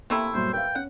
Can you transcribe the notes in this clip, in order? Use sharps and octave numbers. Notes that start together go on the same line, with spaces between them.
C3 A3 A#3 E4
G2 A#2 F#3 C5
B4 F5 G5
C#4 F#5